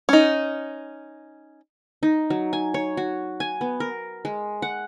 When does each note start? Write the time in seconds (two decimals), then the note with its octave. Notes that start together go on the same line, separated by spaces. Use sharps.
0.09 C#4 D#4
2.03 D#4
2.30 F#3
2.53 G#5
2.74 C#5
2.97 F#4
3.40 G#5
3.61 B3
3.80 A#4
4.25 G#3
4.62 F#5